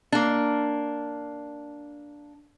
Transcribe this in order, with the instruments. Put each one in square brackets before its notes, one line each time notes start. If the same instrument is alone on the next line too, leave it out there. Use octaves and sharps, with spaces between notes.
[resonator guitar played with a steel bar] A#3 D4